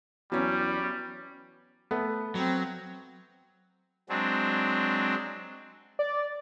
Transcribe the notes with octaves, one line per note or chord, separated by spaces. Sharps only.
E2 F#3 G3 C#4
A3 B3
F#3 C4
F#3 G#3 C4 D4
D5